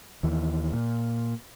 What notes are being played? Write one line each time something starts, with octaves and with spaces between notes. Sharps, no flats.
D#2 E3
A#2